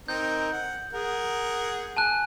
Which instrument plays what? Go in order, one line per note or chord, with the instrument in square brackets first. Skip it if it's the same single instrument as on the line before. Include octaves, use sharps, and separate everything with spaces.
[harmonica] C4 D#4 A#4 [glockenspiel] G6
[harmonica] F#5
G#4 A#4 F#5
[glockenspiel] G#5 A5 F#6